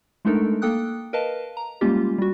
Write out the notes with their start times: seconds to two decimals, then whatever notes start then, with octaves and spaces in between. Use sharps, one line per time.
0.25 G#3 A3 D4 D#4 A4 A#4
0.62 A#3 A4 G5 D#6 F#6
1.13 A#4 B4 D#5 F5 A5
1.57 A#5
1.81 G3 G#3 A#3 C#4 F4 G4
2.18 G3 F#4